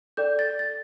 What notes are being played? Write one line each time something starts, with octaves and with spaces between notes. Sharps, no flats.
A4 D5 G5 G6
A6
A6